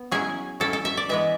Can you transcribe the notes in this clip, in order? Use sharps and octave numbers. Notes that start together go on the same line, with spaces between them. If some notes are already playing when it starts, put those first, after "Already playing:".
Already playing: B3
F#3 C#4 E4 G#4
F#3 C#4 E4 A4
A4
E5
D5
E3 G#3 B3 E5